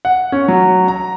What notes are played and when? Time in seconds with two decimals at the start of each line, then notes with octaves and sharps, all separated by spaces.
0.05 F#5
0.32 C#4
0.48 F#3
0.88 A#5